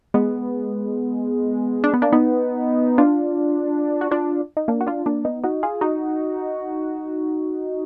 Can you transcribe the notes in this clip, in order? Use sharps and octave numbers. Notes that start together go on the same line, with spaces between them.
G#3 B3
D4
B3
A#3 D4
B3 D#4
D4 F4
F#4
D4 F4
D#4
A#3 D4
F#4
D4 F4
A#3 D4
B3 D#4
D#4 F#4
F4 G#4
D#4 F#4